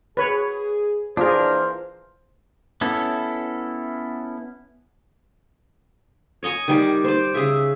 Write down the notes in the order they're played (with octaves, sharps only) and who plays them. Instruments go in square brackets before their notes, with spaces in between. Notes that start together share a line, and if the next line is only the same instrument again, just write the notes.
[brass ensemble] G#4 [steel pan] B4 C#5
[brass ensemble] A#2 E3 [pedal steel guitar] D4 A#4 [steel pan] F4 G#4 [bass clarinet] C5
[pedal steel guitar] B3 C#4 E4 A4
[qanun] C#5 D#5 G#5 C#6
D#3 G3 D5
C5 D5
C#3 G#4 E5